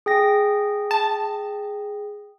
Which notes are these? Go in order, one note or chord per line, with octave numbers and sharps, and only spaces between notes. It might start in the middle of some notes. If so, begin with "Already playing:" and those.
G#4 G5 A#6
A5